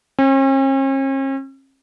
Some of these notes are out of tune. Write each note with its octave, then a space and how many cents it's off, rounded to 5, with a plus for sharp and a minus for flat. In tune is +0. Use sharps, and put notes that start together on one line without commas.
C#4 -45